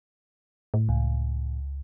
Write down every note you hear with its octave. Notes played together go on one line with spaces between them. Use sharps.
A2
C#2